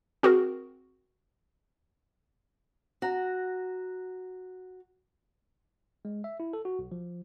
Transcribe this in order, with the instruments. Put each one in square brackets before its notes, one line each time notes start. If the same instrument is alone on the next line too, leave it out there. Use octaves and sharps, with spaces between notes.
[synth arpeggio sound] C4 F#4 G#4 A#4
[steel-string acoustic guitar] F#4 A#5
[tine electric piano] G#3
E5
E4
A4
F#4
B1
F3